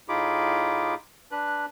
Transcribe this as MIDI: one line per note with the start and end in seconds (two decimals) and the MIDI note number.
0.09 0.94 45
0.09 0.94 63
0.09 0.94 65
0.09 0.94 68
0.09 0.94 83
0.09 0.94 86
1.32 1.66 62
1.32 1.66 71
1.32 1.66 90